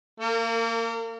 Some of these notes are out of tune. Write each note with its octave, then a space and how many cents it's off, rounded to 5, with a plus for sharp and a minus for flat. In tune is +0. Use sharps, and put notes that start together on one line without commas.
A#3 -25 A#4 -40